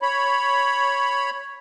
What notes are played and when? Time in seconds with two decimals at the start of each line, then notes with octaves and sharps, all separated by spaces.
0.02 C#5 B5